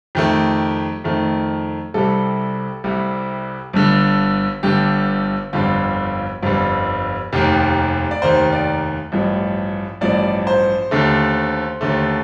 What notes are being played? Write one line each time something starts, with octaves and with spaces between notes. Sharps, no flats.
F2 D#3 A3 G4
F2 D#3 A3
C2 C3 G3 A4
C2 C3 G3
G1 G2 D3
G1 G2 D3 G4
G1 F2 D3 G3 F4
G1 F2 D3 G3 F4
F1 D#2 D#3 G4
D5
F1 D#2 D#3 C5
D5
A1 G2 F3
A1 G2 F3 D5
C5
D#2 D3 A3
D#2 D3 A3